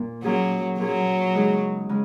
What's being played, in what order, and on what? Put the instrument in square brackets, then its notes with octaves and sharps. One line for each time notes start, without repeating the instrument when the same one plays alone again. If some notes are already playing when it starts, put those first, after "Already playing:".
Already playing: [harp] A#2 A#3
[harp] A#2 A#3 C#4 G#4 [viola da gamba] F#3
[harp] A#2 A#3 C#4 G#4 [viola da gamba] F#3
[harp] C#3 G#3 D#4 G#4 C#5
C#3 G#3